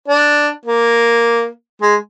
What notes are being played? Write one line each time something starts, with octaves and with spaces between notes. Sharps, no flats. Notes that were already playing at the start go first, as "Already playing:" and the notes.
D4
A#3
G#3